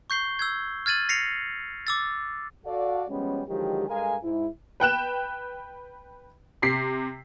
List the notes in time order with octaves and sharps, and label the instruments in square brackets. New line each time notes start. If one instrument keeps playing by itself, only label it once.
[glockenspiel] C#6 G6 C7 G7
E6 G6 G#6
F6 G#6 A6 D#7 F#7
A#6 C7 C#7 F7
D6 E6 A6
[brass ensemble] F#4 A4 D5 F5
F3 G3 G#3 B3 C#4
D3 D#3 F3 F#3 G#3 G4
G2 G#3 A4 A#4 F5 G#5
G#2 E4
[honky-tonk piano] B4 G5 F#6 E7
C3 B6 C7